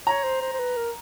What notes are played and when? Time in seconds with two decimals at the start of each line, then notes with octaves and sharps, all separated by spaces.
0.07 C#5 A#5
0.23 C5
0.42 C5
0.53 C5
0.60 B4
0.77 A#4